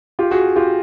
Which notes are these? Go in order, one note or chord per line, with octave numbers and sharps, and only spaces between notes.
F4 G4
F#4 G#4
F4 G4